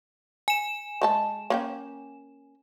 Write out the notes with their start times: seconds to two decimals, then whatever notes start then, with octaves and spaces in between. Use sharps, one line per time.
0.48 G#5 E7
1.02 G#3 A4 A5
1.50 A#3 C#4 G5